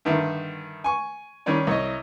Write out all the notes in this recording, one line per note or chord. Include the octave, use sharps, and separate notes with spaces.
G2 D3 D#3 E5
G#5 C#6
D#3 G3 C#4 C#5 D5
C2 C#5 D#5